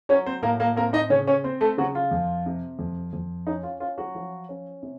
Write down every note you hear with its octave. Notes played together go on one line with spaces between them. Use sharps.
F#3 C#4 C#5
C4 C5
A2 A#3 A#4
A#3 A#4
A#3 C4 A#4
D#4 D#5
C#3 C#4 C#5
C#4 C#5
C4 C5
A3 A4
C#3 F#3 F#4
F4
F2
C3
F2
F2
C#4 D#4
F4
C#4 F4
F#3 F#4
F3
C#4
C3